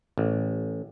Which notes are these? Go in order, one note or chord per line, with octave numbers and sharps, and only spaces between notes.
A1